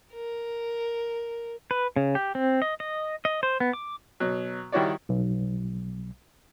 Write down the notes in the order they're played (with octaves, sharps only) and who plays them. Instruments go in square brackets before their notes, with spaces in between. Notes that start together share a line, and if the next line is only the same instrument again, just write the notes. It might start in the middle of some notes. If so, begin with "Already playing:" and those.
[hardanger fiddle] A#4
[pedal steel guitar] B4
C#3
G4
C4
D#5
D#5
D#5
C5
B3
D6
[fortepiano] B2 F#3
D#3 G3 E4 F#4 C#5 D5
[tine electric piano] B1